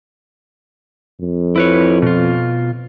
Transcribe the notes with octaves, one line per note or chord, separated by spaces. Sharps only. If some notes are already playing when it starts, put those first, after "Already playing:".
F2
E4 B4 C#5
B2 F4